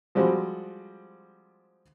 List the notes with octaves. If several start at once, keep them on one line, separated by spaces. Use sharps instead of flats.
F3 G3 G#3 C4 F#4